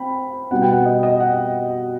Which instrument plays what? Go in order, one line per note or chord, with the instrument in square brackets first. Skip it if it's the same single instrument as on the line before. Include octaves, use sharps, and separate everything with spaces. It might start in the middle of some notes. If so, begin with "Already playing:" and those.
Already playing: [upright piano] C4 G5 B5
B2 G3 B3 F#5
G5
F#5
D#5
D#5
F#5